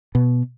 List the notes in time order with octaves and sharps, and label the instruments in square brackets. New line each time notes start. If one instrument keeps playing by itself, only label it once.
[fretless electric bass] B2